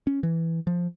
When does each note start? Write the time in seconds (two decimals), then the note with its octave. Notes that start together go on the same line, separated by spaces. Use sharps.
0.07 C#4
0.23 E3
0.67 F3